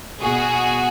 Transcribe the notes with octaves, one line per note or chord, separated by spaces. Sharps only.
B2 F#4 G#4